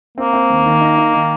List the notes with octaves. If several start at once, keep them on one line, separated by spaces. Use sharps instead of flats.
A#3 C4
C4
D#2
D#3
D#4
D#4
D#3